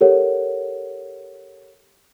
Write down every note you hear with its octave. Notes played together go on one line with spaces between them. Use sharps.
G4 A4 A#4 C#5 F#5